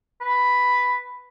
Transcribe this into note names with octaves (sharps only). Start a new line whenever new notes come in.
B4